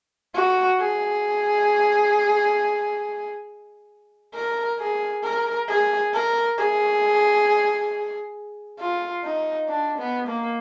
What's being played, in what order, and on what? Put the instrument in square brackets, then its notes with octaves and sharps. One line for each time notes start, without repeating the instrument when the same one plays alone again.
[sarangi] F#4
G#4
A#4
G#4
A#4
G#4
A#4
G#4
F4
D#4
D4
B3
A#3